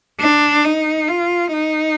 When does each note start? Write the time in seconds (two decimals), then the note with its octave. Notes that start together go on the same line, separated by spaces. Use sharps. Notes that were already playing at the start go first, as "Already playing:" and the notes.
0.21 D4
0.64 D#4
1.08 F4
1.52 D#4